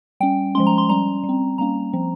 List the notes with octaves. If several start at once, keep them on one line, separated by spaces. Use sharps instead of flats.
G3 C#4 G5
F3 G#3 C#4 C6
A#5
C6
G3 C#4 A#5
G3
C4
G3 A#3 C#4 A#5
F3 C4